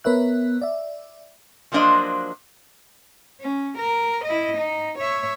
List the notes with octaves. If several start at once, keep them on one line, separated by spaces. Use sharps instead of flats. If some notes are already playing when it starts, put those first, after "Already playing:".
B3 A#4 B4 C#5 E5 F#6
D5 E5
F3 F#3 A#3 D4 C5 D#5
C#4
A#4
E4 D#5
D#4
C#5 E5